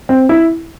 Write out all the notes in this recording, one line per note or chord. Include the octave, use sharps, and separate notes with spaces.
C4
E4